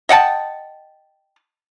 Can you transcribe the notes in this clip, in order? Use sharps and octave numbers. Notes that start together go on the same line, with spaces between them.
D#5 F#5 G5 A5